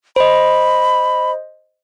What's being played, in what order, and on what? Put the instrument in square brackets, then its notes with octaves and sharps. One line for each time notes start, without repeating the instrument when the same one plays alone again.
[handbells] C5 D#5 [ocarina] B5